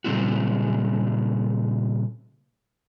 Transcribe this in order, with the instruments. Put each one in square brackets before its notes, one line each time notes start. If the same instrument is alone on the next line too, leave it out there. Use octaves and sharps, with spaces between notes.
[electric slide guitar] A#2 C#3 G3 C4 E4 F#4